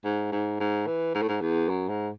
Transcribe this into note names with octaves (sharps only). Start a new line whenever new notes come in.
G#2
G#2
G#2
E3
G#2
A2
G#2
E2
F#2
G#2